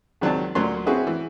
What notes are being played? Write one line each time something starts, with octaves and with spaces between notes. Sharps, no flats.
C#2 D#3 F#3 C4 D4 A5
D2 A#2 F#3 A#3 C#4 C6
C4 C#4 E4 F#4 G#4 B4
E3